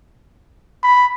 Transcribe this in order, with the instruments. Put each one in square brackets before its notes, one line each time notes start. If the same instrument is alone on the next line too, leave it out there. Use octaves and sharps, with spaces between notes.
[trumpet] B5